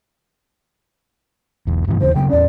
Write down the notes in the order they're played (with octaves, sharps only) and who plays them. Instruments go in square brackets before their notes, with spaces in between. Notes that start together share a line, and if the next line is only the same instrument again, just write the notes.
[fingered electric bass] E1 B1 E2
G2 B2 E3
[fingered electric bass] D#2 C#3 E3 [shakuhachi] C5
[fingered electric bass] C#3 F#3 B3 [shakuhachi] G5
[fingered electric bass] E2 C#4 [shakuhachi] D5